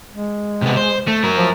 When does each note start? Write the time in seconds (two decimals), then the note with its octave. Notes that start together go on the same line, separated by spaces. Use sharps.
0.11 G#3
0.62 C3 B3
0.77 C5
1.08 A3
1.24 F#3 A#4
1.37 F3